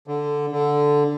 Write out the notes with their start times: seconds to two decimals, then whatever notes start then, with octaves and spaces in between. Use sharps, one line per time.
0.07 D3
0.52 D3